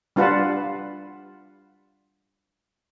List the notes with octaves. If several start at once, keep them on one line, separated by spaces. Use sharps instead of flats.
G3 D4 F4 B4 F#5 A5